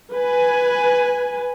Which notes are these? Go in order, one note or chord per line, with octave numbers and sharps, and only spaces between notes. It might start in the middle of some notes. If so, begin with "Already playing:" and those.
B4 G#5